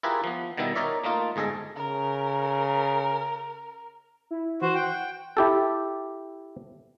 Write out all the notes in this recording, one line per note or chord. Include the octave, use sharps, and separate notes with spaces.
E4 F4 G4 G#4 A#4 B4
F3 B3
B2 D#3 G3 B3 E4
D#4 A#4 C#5 D5 E5
A3 A#3 D#4 F4
G1 G#2 G#4 A4 D#5
C#3 A#4
E4
E3 F#4 C5
F#5 G5
E4 G4 A4